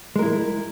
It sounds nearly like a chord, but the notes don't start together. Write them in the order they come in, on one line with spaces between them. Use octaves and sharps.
G#3 A#4 E4